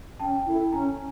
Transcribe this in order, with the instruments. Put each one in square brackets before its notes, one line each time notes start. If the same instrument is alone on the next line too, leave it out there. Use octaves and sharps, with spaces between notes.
[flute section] C#4 [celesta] G5 A5
[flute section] E4 A4
[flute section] C#4 [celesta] G#5 A#5